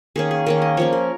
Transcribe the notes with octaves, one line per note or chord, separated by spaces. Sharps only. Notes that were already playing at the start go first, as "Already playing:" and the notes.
D#3 A#3 C#4 G#4
G#4
D#3 A#3 C#4 A#4
D#5
F3 A#3 C#4 C#5
A#4